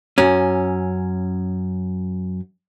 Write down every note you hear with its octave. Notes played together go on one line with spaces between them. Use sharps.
F#2 C#4